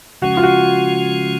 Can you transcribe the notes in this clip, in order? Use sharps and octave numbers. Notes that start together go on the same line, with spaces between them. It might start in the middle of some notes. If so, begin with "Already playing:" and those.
C#3 F3 G#3 C#4 F#4
F4
F#4